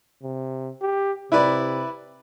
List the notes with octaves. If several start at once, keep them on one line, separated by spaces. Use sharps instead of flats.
C3
G4
C3 E4 B4 D5